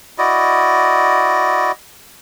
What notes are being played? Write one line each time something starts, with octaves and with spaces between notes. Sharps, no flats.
E4 F#4 D5 D#5